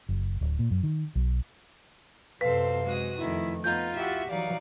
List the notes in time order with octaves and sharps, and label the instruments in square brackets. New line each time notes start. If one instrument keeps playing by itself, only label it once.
[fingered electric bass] F#1
D1
A#2
F#2
D#3
B1
[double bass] F#2 C3 [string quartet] C4 A4 C5 [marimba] B4 [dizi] F5
[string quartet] G#3 F#4 D#6
[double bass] F2 A3 [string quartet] D#3 [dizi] E4
[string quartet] B3 D#4 [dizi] F4 [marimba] G6
[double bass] E4 [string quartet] F#4 G4 E5
[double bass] E3 F#3 [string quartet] D#4 D5 [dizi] F5